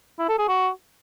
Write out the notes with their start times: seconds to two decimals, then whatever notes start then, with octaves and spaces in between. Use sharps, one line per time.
0.19 E4
0.29 A4
0.39 G#4
0.48 F#4